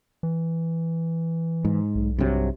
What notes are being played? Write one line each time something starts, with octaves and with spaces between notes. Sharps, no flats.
E3
G#2
B1
G2 C3 F#3